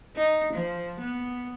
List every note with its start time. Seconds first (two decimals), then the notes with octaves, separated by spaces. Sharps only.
0.16 D#4
0.54 F3
1.01 B3